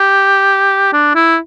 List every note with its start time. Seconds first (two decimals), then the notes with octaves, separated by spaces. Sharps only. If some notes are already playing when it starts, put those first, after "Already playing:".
Already playing: G4
0.93 D4
1.15 E4